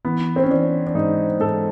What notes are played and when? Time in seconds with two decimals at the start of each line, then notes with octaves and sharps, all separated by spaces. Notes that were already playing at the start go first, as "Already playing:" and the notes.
0.05 E3 B3
0.36 C4
0.43 C#4
0.50 E3 D4
0.87 D4
0.95 G#2 D#4
1.40 G#2 A4